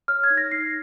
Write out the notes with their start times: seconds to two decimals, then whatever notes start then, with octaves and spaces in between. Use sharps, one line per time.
0.08 C#5 F6
0.24 G#6
0.30 D#4
0.37 A#6
0.52 D#4 C7